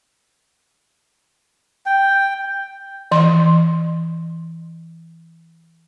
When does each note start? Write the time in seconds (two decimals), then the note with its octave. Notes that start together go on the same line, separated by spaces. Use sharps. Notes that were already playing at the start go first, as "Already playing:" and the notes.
1.86 G5
3.12 E3 C6